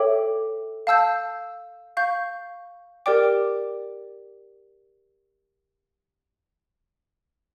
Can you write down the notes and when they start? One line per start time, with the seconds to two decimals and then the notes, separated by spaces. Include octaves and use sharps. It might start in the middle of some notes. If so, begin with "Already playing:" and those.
Already playing: A4 C#5 E5 G5 D6
0.87 F5 A5 E6 G6
1.97 F5 C#6 G6
3.06 G4 A#4 D5 G5 D6